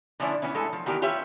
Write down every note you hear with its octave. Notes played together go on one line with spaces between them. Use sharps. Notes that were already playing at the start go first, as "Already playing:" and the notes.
D3 F3 A3 C#4 D4 E4
E3 B3 C#4 E4
E3 G#3 A3 A4
F3
D#3 E3 B3 G4 A#4
F4 G4 B4 C#5 E5